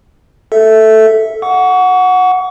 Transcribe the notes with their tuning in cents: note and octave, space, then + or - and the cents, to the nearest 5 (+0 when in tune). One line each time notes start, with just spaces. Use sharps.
A4 +0 E5 -5
F#5 -10 C#6 +35